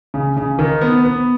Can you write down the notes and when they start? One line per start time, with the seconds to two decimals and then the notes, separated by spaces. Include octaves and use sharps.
0.14 C#3
0.37 C#3
0.59 D#3
0.81 B3
1.05 B3